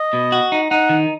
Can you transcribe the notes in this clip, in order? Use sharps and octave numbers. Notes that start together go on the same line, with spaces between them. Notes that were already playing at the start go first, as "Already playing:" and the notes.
Already playing: D#5
B2
F#4
D#4
D#4 F#5
D#3